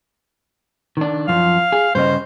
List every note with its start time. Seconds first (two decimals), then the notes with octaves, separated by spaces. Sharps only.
0.97 D#3 D4
1.28 F#2 F3 F5
1.72 G#4
1.95 G2 C#3 C5 D#5